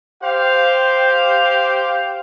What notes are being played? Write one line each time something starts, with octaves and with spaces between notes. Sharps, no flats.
G4 C5 F5